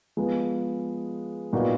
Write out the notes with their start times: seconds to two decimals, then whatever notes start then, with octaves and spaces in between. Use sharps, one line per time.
0.17 F3 G#3 B3
1.53 A#2 G3 B3 D#4 F#4